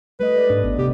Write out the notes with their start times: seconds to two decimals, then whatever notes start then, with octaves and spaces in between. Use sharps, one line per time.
0.20 G3 A3 B4 D#5
0.37 D5
0.50 G#2 D4
0.64 G#1 B3
0.78 C3 G4